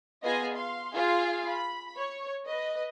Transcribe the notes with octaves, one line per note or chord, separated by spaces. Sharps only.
B3 F4 G#4 D#5 G#5
F5 C6
F4 G#4 F5
B5
C#5
B4 D#5